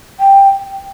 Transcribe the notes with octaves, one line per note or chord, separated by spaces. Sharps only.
G5